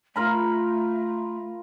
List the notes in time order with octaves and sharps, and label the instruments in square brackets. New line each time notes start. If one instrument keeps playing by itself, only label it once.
[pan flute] A3 [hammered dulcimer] F4 A#4 B5